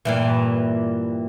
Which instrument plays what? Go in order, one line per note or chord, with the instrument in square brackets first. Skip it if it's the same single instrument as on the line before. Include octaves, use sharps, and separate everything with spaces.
[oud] G2 A#2 E3